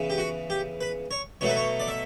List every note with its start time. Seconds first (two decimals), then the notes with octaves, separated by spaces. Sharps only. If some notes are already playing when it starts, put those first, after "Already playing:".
Already playing: C#3 E3 B3
0.10 G4
0.18 F#4
0.50 G4
0.81 B4
1.11 C#5
1.41 B2 F#3 A3 C#5
1.49 B4
1.57 C#5
1.80 D5
1.88 E5